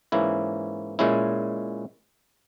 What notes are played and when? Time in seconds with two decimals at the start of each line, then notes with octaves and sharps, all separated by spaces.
0.12 G#2 E3 A#3 C#4 E4
0.99 A#2 G#3 C#4 E4